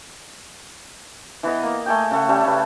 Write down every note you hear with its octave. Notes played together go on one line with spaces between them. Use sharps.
E3 B3 D#5
A#3
A3 G#4 G5
C#3 A3 F#5
G3 A3 C#4
C#3 B4